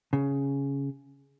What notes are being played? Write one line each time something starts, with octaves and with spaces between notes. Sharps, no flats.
C#3